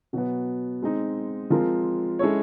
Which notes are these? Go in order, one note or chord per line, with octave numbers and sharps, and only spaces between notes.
B2 F#3 B3
G#3 C4 D#4
F3 G#3 C4 F4 A#4
G#3 C#4 E4 A4 C#5